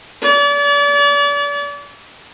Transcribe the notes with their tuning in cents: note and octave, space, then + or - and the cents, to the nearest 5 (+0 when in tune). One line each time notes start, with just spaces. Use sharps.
D5 -35